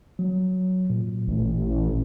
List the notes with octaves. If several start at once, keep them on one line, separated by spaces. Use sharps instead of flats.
F#3
A#2
A1